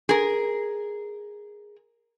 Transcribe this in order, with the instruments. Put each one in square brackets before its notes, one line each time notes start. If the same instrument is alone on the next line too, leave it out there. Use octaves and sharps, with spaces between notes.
[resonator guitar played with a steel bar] G#4 A#4